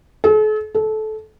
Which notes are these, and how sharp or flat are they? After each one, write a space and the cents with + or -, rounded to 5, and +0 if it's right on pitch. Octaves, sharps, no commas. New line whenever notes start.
A4 -45
A4 -20